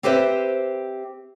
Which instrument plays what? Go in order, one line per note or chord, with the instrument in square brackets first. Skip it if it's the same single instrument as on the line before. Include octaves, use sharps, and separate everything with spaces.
[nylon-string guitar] C4 G4 B4 C5 E5